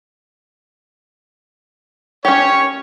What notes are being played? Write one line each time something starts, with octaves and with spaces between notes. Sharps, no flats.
C#4 G4 C#5